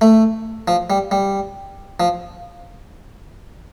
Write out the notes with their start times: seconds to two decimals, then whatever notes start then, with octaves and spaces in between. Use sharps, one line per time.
0.01 A3
0.68 F3
0.90 G3
1.11 G3
2.00 F3